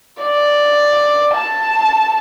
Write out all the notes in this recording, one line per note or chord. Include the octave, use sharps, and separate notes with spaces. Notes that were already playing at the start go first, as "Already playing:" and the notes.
D5
A5